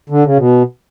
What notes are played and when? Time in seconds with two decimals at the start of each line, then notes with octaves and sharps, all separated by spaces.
0.10 D3
0.24 C#3
0.37 B2